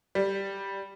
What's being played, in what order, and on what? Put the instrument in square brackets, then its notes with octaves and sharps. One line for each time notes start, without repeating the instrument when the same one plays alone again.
[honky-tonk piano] G3